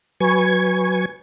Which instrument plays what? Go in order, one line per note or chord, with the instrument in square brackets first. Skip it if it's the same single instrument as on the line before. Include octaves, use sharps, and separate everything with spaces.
[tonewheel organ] F#3 B4 G#5 C#6 G#6